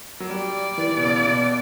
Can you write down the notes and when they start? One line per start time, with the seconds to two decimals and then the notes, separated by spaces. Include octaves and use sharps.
0.20 F#3
0.30 G3 D5
0.78 E3
0.97 B2
1.03 C#3
1.26 B2